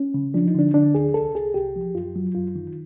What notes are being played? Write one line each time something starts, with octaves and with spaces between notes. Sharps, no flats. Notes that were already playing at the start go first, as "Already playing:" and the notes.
Already playing: C#4
C#3
F3 D4
D#4
D3 D4
D3 D4
D2 G#4
C2 A4
C2 G#4
C2 G4
F3
F#2 F4
F#3
F#2 F4
D#3